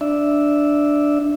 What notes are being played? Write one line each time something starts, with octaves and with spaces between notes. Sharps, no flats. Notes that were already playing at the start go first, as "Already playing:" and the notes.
D4 E5